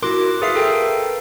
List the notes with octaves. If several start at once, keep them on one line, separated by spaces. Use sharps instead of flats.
E4 F#4 A#4 C6 D6 F#6
G#4 B4 E5 F5 C7
A4 A#4 G5